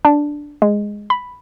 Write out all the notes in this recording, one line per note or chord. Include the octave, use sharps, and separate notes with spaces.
D4
G#3
B5